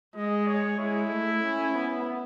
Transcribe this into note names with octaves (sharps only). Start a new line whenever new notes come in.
G#3 D#5
C#5
G#3 E4
A3
C#4
B3